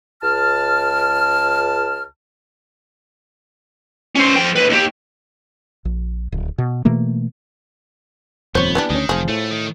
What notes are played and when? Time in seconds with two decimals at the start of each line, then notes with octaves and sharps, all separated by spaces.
0.23 C#2 A5 F6
4.15 C#4 C5
4.36 F3 G5
4.56 D#2 B4
4.69 D#2 G4
5.85 A#1
6.32 D1
6.58 B2
6.85 B2 E3 A3 A#3
8.55 D#1 F2 B3 C5 C#5
8.75 E3 G3 D4
8.90 D2 D#3 C#4
9.09 F1 F3 G#4
9.29 A2 A3
9.51 D#3